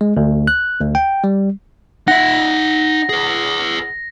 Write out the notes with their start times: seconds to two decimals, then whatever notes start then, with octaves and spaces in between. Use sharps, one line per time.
0.01 G#3
0.17 D2
0.47 F#6
0.80 D2
0.95 G5
1.24 G3
2.08 D#4 E5 F#5 A#6
3.09 G#4 B4